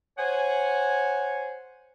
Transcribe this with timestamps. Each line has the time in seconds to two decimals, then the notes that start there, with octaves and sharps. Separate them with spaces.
0.17 C5 C#5 F#5 G#5